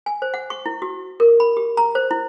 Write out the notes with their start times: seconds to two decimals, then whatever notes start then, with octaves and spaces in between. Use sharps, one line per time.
0.06 G#5
0.22 C5
0.34 F#5
0.50 C#6
0.66 E4
0.82 F#4
1.20 A#4
1.40 B5
1.57 G4
1.77 A#5
1.95 C5
2.11 E4